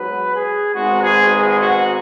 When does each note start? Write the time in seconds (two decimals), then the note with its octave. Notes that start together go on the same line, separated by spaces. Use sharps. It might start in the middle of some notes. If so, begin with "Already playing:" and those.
Already playing: G#2 F#3 B3 B4
0.32 G#4
0.74 G#1 G#2 G#3 B3 F#4
1.03 G#4
1.31 G#4
1.59 F#4